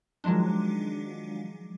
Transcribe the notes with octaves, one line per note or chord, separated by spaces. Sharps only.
D#3 F3 F#3 G#3 D4